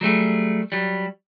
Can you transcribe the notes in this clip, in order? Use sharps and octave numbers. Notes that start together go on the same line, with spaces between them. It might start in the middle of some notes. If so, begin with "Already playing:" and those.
F#3 G3 A3 G#4
F#3 G3